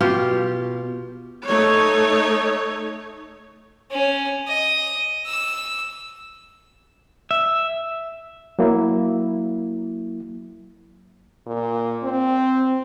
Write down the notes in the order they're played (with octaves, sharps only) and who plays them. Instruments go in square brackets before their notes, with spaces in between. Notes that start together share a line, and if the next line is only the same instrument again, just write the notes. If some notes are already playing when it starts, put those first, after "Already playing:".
[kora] B2 F4 G4
[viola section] A3 D#4 C#5
[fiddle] C#4
D#5
E6
[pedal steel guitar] E5
[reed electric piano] F#3 A#3 E4
[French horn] A#2
C4